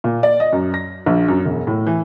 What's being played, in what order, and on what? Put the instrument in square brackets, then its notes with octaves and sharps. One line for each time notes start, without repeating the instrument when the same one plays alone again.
[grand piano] A#2
D5
D#5
F#2
A#6
A#1
F#2
E1
A2
E3